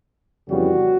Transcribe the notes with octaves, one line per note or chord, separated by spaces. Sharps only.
F2 C#3 E3 G3 B3 F#4